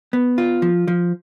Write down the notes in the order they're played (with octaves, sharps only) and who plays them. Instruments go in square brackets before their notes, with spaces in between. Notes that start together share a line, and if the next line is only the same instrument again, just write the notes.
[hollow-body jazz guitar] B3
F4
F3
F3